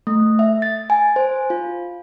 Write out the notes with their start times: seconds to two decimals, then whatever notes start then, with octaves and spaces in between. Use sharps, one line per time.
0.07 A3
0.39 E5
0.62 A6
0.90 G#5
1.16 C5
1.50 F4